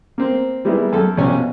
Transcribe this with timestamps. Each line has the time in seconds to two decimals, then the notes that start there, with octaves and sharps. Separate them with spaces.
0.18 A#3 C4
0.65 G3 G#3 A#3 B3 E4 G#4
0.93 F#2 A4
1.17 A#1 C3 C#4 G#5
1.32 B2